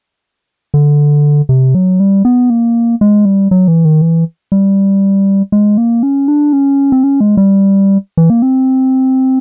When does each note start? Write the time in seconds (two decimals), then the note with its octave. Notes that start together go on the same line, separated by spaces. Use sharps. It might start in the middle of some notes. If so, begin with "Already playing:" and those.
0.74 D3
1.49 C3
1.75 F#3
2.00 G3
2.25 B3
2.50 A#3
3.01 G#3
3.25 G3
3.51 F#3
3.68 E3
3.85 D#3
4.02 E3
4.52 G3
5.52 G#3
5.78 A#3
6.03 C#4
6.28 D4
6.53 C#4
6.92 C4
7.04 C#4
7.21 G#3
7.37 G3
8.17 E3
8.30 A#3
8.42 C4